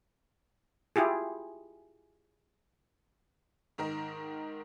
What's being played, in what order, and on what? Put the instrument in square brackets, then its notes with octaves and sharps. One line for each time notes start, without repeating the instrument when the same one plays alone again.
[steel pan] E4 F4 G4 G#4
[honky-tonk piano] G#2 D#3 A#4